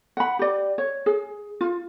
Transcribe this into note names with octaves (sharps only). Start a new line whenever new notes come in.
F#5 B5
G4 D5
C#5
G#4
F4